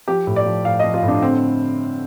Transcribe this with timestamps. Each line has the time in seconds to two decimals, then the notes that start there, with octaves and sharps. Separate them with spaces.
0.08 F3 G4
0.27 A2
0.36 D5
0.46 F3
0.65 A2 F5
0.79 D#5
0.84 F3
0.94 F4
1.03 A2 D4
1.22 D3 C4